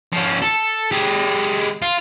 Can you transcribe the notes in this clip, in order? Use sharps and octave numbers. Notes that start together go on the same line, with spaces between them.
F3 C#4
A4
G#3 G4
F4